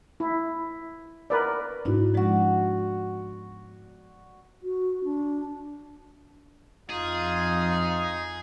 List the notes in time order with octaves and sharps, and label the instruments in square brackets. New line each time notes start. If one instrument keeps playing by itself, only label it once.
[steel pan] E4
A#4 B4 D5
[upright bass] G#2 B3 [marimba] D4 E4 F#4
[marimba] F3 G#3 [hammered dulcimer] F#4 D5
[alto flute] F#4
D4
[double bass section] F2 [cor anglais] D#4 [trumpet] F4 [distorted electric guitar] G#4